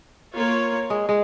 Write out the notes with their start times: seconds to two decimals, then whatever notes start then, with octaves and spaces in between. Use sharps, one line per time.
0.35 A#3 F4 C#5
0.90 G#3
1.09 G#3